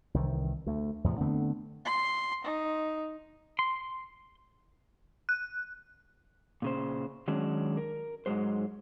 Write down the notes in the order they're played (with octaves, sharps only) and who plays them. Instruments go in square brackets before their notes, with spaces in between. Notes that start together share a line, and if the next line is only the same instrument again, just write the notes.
[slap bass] C2 D#3 E3
D2 A3
E2 A2 C3 F3
D3 A3 B3 C4
[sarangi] C6
D#4
[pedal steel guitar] C6
[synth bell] F#6
[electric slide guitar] A#2 C#3 C5
D#3 F#3 G#3 C#4 D4
A#4
G#2 E3 F#3 G#3 C5